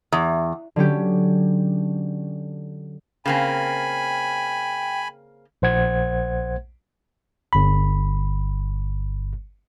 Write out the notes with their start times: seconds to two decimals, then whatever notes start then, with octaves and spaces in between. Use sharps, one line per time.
0.12 E2
0.76 D3 F#3 C#4 G4
3.26 C#3 A#3 C4 G5 G#5 B5
5.62 A#1 C5 F#5 G#6
7.53 G1 B5